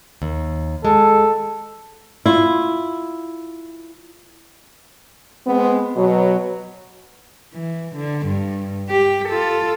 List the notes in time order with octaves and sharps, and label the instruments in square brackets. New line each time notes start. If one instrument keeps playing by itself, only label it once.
[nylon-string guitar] D#2
[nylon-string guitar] G#3 [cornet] A4
[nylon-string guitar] E4 F4
[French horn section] G#3 B3 C4
B2 F#3
[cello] E3
D3
G2
G4
F4 A4